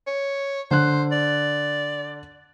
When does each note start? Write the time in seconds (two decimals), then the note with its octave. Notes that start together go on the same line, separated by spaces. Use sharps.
0.07 C#5
0.71 D3 C5 F#6
1.12 D5